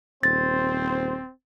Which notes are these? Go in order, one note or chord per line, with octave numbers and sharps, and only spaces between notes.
D#1 C4 C5 A6